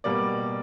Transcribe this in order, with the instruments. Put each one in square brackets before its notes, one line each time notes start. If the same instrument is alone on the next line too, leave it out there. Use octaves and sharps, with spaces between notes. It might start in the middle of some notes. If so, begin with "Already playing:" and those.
[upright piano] B2 G3 A#3 D5